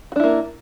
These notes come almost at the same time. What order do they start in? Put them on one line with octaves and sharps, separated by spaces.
F#4 D4 E4 A#3